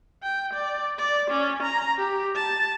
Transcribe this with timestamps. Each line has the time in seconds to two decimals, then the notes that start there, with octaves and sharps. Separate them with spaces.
0.23 G5
0.54 D5
0.99 D5
1.31 C#4
1.63 A#5
1.98 G4
2.36 A5